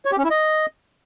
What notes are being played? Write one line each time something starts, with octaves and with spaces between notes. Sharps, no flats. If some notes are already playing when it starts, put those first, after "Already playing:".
C#5
G4
C#4
E4
D#5